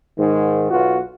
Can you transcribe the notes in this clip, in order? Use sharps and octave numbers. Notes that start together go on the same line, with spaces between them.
G#2 D#3
B1 B2 F4 F#4